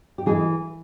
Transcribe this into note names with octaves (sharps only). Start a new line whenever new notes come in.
G4
E3 G#3 G#4